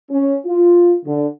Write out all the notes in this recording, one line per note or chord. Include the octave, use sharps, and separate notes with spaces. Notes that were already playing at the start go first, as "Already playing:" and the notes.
C#4
F4
D3